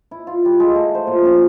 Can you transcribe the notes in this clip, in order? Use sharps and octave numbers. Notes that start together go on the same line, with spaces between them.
E4
F4
G3
G#3
A3
C5
A#2
C#4